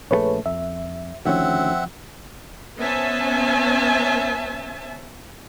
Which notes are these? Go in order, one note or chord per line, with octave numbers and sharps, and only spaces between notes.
A#1 D3 A3 G#4 B4 C#5
F2 E5
D2 D#3 F3 C4 C#4 E5 F#5
B3 C#4 C5 E5 G#5 A5